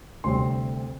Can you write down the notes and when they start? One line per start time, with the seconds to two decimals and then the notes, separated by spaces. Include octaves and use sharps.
0.24 D2 C3 G3 C4 C6